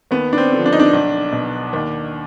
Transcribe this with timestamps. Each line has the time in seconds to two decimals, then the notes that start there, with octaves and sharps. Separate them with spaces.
0.11 D#2 B3
0.33 D4
0.38 C4
0.52 D3 F3
0.66 D4
0.73 D#4
0.80 D4
0.93 B1
1.32 B2
1.73 D#2